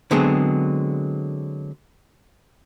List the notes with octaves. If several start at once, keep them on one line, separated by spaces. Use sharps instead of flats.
D3 F#3 G#3 B3 C4 G#4